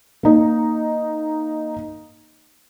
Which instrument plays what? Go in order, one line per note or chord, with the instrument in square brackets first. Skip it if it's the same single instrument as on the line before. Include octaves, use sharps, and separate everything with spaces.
[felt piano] A#3 D#4